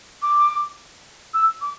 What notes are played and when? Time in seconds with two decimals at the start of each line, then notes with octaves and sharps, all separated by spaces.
0.22 D6
1.34 E6
1.61 D6